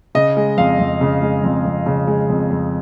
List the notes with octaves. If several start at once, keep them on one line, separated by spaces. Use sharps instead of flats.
C#3 D#5
G#3
F2 F5
F2
C#3
G#3
F2
F2
C#3
G#3
F2
F2